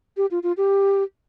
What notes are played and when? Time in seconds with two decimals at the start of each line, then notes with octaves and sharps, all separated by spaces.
0.17 G4
0.31 F4
0.43 F4
0.57 G4